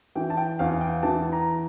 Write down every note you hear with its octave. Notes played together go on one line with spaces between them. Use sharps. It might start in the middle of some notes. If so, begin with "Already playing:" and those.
E3 G5
A5
G5
E2 F5
G5
E3 A5
A#5